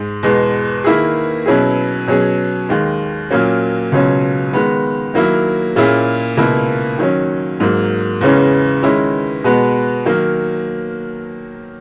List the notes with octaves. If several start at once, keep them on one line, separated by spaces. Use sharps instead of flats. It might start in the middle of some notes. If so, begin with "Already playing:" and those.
Already playing: G#2 G#3
E2 B2 G#3
D#3 A#3 E4 G#4
B2 F#3 C#4 E4 G#4
B2 F#3 C#4 G#4
D#2 D#3 G#3
A#2 F#3 A#3 C#4
C#2 B2 F#3 C#4
D#3 G#3 B3
D#3 F#3 A#3 E4
A#2 A#3 C#4 E4 G#4
C#2 B2 A#3 E4
D#3 F#3 C#4
G#2 F#3 A#3
E2 C#3 E3 G#3 C#4
D#3 G#3 C#4 E4
B2 G#3 B3 F#4
D#3 F#3 A#3